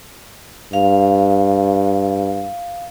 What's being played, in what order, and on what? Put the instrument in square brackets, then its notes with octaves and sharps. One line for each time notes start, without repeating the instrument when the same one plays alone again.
[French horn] G2 [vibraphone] F5